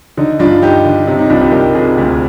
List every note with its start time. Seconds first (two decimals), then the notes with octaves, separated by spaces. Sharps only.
0.17 D3 D#4
0.39 G2 D4 F4
0.62 G2 D#4 G4
0.85 D3
1.07 C3 D#4
1.19 D#4
1.30 C2 D4 F4
1.41 D#4 G4
1.52 C2 G4 A#4
1.75 C3 F4 G#4
1.98 D2